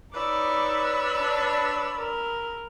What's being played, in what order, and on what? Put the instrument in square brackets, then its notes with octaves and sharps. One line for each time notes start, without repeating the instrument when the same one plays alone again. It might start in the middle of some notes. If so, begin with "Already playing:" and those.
[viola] D#4 D6 [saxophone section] B4 C#5 D5 [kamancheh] B5 E6
[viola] D4
A#4